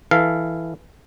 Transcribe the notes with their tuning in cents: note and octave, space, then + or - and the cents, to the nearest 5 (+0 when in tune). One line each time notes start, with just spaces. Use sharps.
E3 +0 A4 +0 F5 -10